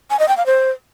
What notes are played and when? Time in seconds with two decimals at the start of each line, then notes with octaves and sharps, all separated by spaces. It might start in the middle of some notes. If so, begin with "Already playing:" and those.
0.10 G#5
0.19 D#5
0.28 G5
0.37 F5
0.46 C5